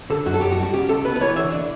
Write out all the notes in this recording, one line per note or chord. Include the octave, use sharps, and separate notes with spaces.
D3 A4
F#2 F#4
A4
F#2 G4
F#4
G3
F#4
C#3 G4
C#2 A4
B3 B4
B4
E3 C#5
D3 E5
D5